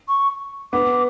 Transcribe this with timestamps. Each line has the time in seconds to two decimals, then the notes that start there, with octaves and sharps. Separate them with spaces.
0.08 C#6
0.73 B3 D6